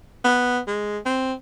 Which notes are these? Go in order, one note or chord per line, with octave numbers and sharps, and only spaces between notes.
B3
G#3
C4